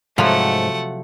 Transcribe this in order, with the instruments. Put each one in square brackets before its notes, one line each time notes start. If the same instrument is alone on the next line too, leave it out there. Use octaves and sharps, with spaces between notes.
[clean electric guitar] G#2 [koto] C3 F3 F#3 [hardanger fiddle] A3 F#5